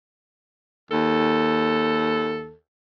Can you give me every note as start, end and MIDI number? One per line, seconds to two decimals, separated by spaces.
0.91 2.57 39
0.91 2.55 69